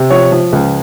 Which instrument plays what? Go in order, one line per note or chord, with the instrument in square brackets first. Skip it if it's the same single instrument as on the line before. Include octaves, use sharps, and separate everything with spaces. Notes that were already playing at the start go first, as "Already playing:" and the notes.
Already playing: [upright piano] C3
F3 C#5
F3
C#2